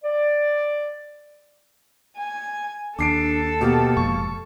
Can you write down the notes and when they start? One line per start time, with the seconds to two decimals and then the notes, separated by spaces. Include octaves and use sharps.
0.04 D5
2.17 G#5
2.99 D#2 D4 A4 D6 C7 D7
3.61 B2 A#3 G4
3.97 F1 F2 G#2 C#6